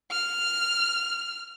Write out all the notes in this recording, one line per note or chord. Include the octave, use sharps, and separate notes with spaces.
F6